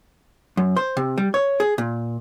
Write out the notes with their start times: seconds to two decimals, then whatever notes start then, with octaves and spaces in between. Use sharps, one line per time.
0.57 F#2
0.76 C5
0.97 C3
1.18 G3
1.34 C#5
1.60 G#4
1.78 A#2